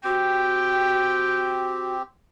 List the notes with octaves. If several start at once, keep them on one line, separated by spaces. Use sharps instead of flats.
C4 F#4 G4 G5